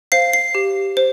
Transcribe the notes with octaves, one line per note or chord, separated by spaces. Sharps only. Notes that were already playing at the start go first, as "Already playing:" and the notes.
C5 F5 C7
C7
G4
C5